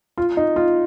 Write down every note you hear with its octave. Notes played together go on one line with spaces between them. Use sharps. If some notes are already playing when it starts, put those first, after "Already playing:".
F4
D#4
F4